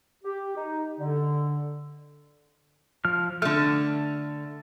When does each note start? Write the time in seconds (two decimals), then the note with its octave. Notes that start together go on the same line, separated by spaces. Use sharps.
0.23 G4
0.56 D#4
0.99 D3
3.05 F3 F6
3.42 D3 A3 F6